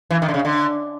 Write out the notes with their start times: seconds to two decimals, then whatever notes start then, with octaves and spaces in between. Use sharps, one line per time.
0.11 E3
0.22 D#3
0.28 D3
0.34 C#3
0.45 D3